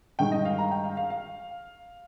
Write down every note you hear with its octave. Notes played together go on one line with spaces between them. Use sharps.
G2 D#3 G#3 G5
D#5
F5
A#5
G5
F5
F5
F5